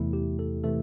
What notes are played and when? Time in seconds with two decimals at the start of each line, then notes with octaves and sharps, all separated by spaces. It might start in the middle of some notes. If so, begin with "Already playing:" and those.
Already playing: E2 C3 E3 A3 E4
0.13 G4
0.39 A4
0.64 C3 E3 A3 A4